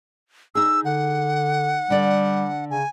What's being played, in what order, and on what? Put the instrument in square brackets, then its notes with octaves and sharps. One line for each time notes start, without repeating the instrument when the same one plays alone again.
[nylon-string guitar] D#4 G#4 [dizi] E6
[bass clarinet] D3 [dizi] F#5
[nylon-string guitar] D3 D5 [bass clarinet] G3
[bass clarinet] C#3 [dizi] G#5